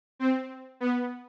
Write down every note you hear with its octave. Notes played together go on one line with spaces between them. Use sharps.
C4
B3